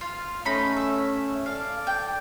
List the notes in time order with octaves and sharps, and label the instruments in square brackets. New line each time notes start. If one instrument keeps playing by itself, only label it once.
[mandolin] F4 [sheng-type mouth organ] F5 F6
[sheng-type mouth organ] A3 C#4 [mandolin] D#4 B5
[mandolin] E5
[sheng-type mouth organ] A4 D5 D6 [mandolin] F5
[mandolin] G5